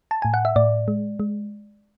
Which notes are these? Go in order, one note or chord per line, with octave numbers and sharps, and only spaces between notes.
A5
A2 G#5
F#5
E5
A2 D5
G#3
G#3